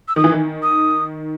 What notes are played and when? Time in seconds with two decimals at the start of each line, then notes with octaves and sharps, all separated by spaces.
0.08 E6
0.16 D#3 D#6
0.24 E3
0.32 D#3
0.62 D#6